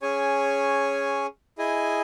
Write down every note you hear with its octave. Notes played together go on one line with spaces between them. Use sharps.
C#4 G#4 C#5 G#5
E4 G#4 D#5 G#5